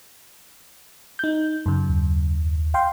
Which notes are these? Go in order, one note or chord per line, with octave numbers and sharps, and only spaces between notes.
D#4 G6
F#2 C#3
D#2
F5 G5 C6